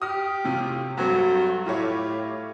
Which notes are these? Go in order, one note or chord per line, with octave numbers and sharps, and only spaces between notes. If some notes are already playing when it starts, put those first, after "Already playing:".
G4 D#6 F6
A2 C3 F4
G2 F#3 C4 A4
A2 F4 G4 C#5